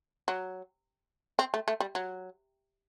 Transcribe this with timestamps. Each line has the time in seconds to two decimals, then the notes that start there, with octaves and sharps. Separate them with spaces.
0.28 F#3
1.39 C4
1.54 A3
1.68 A3
1.80 G3
1.95 F#3